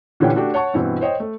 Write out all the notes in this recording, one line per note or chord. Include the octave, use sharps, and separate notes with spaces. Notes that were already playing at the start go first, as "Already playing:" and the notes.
A#2 D3 E3 C#4 D4 G4
A3 D4 F#4 G4
C#5 F#5 A5 C#6
G2 B2 E3 C4
C5 C#5 D#5 G5
A3